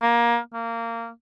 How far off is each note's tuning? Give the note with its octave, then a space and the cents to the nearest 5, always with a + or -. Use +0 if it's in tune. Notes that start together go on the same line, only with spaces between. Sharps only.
A#3 +20
A#3 -20